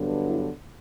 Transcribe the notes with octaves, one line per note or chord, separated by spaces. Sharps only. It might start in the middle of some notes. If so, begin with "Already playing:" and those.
Already playing: G2 D3 F#3 B3
E4